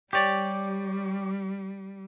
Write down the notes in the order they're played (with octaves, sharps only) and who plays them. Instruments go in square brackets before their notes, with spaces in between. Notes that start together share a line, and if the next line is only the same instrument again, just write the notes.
[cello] G3 [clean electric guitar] G4 C#5 D5